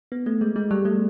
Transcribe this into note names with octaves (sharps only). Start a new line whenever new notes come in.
B3
A3
G#3
G#3
G3
A3